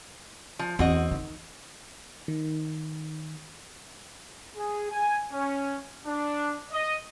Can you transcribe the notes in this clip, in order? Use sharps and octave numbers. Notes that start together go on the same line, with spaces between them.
F3
E2 C4 F#4 D#5
D#3
D#3
G#4
G#5
C#4
D4
D#5